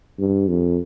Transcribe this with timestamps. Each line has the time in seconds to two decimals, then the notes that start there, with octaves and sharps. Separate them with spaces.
0.19 G2
0.48 F2